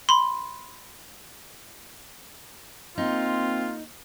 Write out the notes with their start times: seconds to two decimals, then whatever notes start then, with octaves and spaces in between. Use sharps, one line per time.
0.09 B5 C6
2.98 A#3 C4 D#4 F4